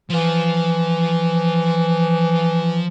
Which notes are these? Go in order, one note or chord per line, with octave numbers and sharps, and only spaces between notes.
E3 F3 F5